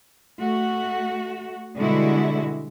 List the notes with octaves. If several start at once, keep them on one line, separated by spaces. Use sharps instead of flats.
A3 F#4
B2 D3 G3 G#3 E4 F#4